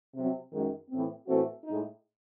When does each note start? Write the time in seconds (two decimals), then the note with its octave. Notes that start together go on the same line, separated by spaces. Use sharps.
0.14 C3 F#3 C4
0.52 F#2 D#3 G#3
0.90 A2 E3 C4
1.27 A2 E3 A3 C4 F#4
1.64 A2 G#3 D#4